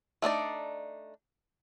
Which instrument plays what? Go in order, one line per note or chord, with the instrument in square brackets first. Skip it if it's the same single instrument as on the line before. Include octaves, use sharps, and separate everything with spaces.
[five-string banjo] A3 D4 D#4 D5